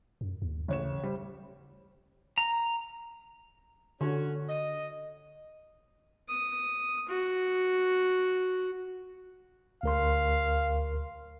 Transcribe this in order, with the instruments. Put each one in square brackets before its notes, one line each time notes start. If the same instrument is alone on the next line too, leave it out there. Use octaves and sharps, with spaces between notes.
[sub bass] F#2
D#2
[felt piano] A1 C#5 E7 [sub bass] C#3
[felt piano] G3 C5
[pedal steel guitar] A#5
[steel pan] D3 [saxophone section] C#4 F#4
[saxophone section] D#5
[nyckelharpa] D#6
F#4
[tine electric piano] D2 A#4 C6 [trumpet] F5